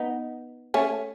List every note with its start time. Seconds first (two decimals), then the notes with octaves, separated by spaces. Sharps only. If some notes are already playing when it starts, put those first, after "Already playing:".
Already playing: B3 D#4
0.74 A3 C#4